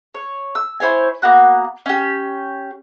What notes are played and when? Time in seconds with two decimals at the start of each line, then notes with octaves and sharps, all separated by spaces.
0.14 C#5
0.55 E6
0.80 E4 C5 C#5 G#5
1.22 A#3 B3 F#4 F#6
1.86 C#4 G4